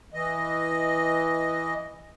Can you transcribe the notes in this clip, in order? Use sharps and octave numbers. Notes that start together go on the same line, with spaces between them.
E3 D#5